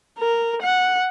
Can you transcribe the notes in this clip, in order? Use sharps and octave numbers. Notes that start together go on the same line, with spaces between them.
A#4
F#5